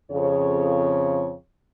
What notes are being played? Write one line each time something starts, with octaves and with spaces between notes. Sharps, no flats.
F2 C#3 C#5